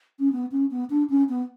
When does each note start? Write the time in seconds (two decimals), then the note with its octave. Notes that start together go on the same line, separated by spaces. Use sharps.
0.19 C#4
0.32 B3
0.52 C#4
0.71 B3
0.90 D4
1.10 C#4
1.29 B3